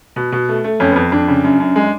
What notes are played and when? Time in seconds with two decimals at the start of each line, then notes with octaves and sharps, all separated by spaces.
0.16 B2
0.32 B2
0.49 A3
0.64 A3
0.80 F2 C#4
0.91 B3
0.96 F2
1.12 F2 D4
1.28 C#3
1.44 F#2
1.60 F#2
1.76 G#3